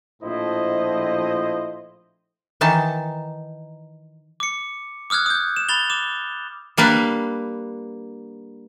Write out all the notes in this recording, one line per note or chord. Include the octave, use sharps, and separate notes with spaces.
A#1 A2 F3 E4 C5 D#5
D#3 E3 D#4 A5
D6 C#7
D6 D#6 F6 F#6 G#6
D#6 G6
E7
B5 A6 F7 G7
D6 E7
G3 A#3 D4 B4